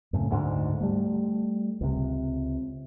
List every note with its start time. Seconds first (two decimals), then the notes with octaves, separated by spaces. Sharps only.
0.13 F#2 A2 C#3
0.31 D2 G#2 D3
0.81 G3 A3
1.81 C#2 C3